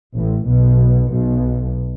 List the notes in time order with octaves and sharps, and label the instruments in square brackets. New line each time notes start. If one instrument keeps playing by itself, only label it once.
[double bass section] A1 A2
B1 B2
B1 B2